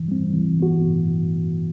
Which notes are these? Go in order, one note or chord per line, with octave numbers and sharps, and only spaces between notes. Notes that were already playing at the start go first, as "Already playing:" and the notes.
Already playing: E3
G3 C4
E3
B3 F#4